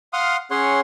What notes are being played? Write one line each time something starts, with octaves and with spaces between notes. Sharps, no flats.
F5 F#5 C6 D#6 F6
C#4 G#4 C#5 F#5 C6